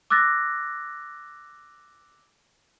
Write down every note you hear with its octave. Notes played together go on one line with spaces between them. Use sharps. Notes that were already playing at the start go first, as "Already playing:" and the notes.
D6 E6 F#6 A6 A#6